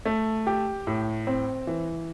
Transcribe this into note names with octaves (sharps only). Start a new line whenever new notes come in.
A3
G4
A2
C4
E3